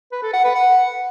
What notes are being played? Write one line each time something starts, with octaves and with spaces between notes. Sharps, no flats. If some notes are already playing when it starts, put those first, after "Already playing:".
B4
A4
F#5
B4
F#5